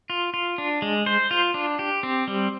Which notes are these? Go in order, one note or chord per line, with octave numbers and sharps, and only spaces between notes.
F4
F4
D4
G#3
C5
F4
D4
G4
C4
G3